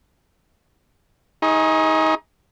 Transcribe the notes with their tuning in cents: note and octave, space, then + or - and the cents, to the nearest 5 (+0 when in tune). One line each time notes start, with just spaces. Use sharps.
D#4 +30 G#4 -10 C#6 -30